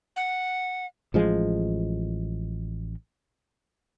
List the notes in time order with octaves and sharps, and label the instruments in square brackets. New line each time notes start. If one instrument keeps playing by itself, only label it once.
[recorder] F#5
[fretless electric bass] A1 F3 G#3